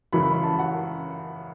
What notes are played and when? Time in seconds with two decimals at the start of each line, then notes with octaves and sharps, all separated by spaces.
0.13 F#2 C#3 E3 B5
0.23 B5
0.33 B5
0.43 A5
0.59 F#5